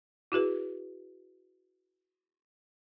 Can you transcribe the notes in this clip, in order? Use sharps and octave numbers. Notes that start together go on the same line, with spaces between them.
E4 F#4 G#4 B4